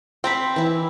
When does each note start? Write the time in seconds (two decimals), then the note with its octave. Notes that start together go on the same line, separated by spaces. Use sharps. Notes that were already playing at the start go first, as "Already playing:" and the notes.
0.24 C4 G5 A#5 B5
0.56 E3 E4